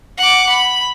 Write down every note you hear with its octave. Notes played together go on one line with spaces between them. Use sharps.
F#5 D6
B5